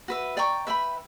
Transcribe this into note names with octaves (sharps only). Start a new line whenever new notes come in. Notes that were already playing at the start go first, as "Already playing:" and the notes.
F#4 B4 E5
D5 G5 A#5 C#6
B4 E5 G5 B5